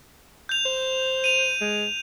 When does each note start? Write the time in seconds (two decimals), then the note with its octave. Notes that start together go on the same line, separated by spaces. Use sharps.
0.49 G6 F7
0.65 C5
1.24 D#7 F7
1.61 G#3